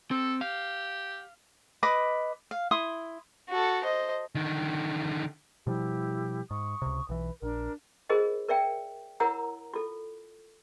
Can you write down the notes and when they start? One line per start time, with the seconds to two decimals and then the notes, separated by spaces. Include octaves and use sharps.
0.11 C4 A4
0.41 G4 F5
1.83 B4 D#5 B5 D6
2.51 F5
2.71 E4 C6 D#6
3.49 F#4 A4
3.83 C5 D#5
4.35 D3 D#3
5.67 B2 F3 G3 E4 G4
6.51 G#2 C#6 D#6
6.82 C#2 C3
7.09 B1 E3 B4
7.42 A#1 D4 A#4
8.10 F4 G#4 A#4 C5 D#5
8.49 A#4 D5 E5 G5
9.20 E4 A#4 C#5 F#5 A#5 E6
9.74 F4 A4